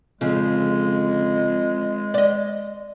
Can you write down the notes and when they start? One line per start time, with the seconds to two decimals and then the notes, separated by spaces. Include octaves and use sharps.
0.21 F2 C#3 G#3
2.14 D5 D#5